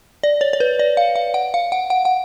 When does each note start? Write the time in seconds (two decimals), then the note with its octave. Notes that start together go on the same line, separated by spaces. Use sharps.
0.23 D5
0.41 C#5
0.53 C#5
0.60 B4
0.79 D5
0.97 F5
1.16 F5
1.34 F#5
1.54 F5
1.72 F#5
1.90 F#5
2.05 F#5